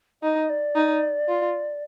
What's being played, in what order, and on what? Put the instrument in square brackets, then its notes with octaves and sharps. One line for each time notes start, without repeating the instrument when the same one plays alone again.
[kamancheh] D#4 [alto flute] D#5
[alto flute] D5
[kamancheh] D#4
F4